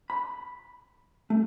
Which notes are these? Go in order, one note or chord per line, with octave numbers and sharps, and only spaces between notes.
B5
A3